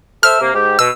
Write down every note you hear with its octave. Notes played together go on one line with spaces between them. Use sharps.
A4 C5 E5 F6
C3 A#3
G#2 G4
B2 E6